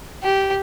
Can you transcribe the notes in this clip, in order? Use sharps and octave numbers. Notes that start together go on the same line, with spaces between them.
G4